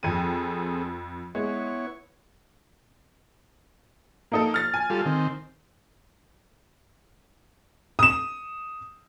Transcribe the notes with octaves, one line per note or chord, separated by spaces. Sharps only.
F2 C4 G#4 A4 D#7
G#3 B3 E4 C#5
A#3 D#4 A4
F6 A6
G#5
G3 F4 A4
D#3 C4
D#6 E7